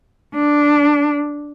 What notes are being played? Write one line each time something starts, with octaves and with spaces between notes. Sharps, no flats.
D4